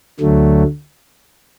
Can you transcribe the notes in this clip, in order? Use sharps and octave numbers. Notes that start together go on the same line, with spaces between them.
D2 D3 F#3 A3